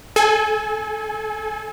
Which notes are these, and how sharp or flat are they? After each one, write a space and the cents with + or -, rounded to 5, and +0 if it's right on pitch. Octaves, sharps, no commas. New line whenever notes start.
A4 -30 G#5 +0